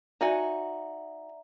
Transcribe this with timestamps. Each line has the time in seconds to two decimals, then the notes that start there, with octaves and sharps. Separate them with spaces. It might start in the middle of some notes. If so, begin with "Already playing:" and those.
0.21 D#4 F#4 D5 E5 G#5 A#5